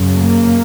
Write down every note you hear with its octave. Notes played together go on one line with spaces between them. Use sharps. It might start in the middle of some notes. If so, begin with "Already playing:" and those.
Already playing: F#2 C#3
A#3